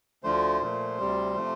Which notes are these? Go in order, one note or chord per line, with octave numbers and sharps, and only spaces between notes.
D2 D3 F3 A3 C5
A#2 F3 A3
D2 C3 G3
C3 F3 A3